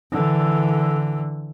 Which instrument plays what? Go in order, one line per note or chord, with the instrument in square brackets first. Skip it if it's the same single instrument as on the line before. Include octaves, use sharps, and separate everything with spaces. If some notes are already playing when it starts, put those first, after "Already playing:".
[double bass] D3 E3